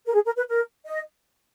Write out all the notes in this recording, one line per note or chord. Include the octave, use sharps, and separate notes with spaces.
A#4
G#4
A#4
B4
A#4
D#5